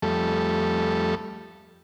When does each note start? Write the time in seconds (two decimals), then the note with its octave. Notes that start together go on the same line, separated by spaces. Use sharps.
0.02 F2 G3 A3 A4